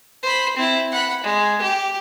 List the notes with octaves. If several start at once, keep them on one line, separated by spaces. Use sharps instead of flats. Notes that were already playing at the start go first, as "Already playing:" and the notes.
C5 B5
C4 E4
F#5 B5
G#3
G4